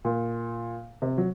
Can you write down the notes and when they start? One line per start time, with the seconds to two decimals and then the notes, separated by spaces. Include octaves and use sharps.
0.05 A#2
1.02 C3
1.18 F#3